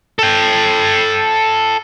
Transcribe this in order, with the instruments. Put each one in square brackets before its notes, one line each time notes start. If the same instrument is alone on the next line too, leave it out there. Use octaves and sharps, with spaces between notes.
[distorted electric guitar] A4 G5